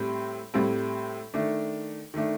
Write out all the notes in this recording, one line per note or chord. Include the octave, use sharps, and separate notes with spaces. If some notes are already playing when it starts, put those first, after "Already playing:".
Already playing: A2 G3 C4
A2 G3 C4
D#3 A3 D4
D#3 A3 D4